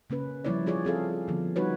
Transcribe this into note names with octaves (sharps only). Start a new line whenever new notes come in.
C#3 A#3 C#4 B4
F3 G3 A#3 E4 C#5 D5
F4 G#4 C#5 D5
C4 G#4 A4 F5
D3 F3 B3
G3 D#4 F#4 B4 C#5